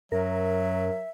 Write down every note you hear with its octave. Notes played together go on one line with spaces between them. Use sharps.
F#2 F#3 A#4 E5